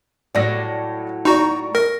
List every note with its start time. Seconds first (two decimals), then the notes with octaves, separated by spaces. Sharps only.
0.35 A2 F#3 D5 A#6
1.25 D#4 F#4 D5 A#5 C#6
1.75 A#4 A#6